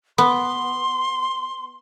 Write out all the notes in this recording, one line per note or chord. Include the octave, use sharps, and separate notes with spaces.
B3 C6